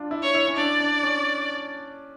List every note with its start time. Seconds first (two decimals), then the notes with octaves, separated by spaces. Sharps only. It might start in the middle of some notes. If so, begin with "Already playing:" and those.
Already playing: D4 F4
0.11 E4
0.22 C#5
0.35 E4
0.47 C#4
0.57 D4 D5
0.80 D4
1.03 C#4